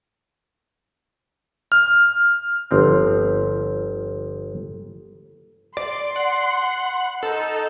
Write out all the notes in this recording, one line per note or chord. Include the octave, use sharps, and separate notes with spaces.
F6
G1 F3 C4
D5 C6
F#5
D#4 A4